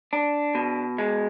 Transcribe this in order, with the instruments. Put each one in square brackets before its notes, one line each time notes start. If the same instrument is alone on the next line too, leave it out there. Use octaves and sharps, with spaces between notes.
[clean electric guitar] D4
B2
G#3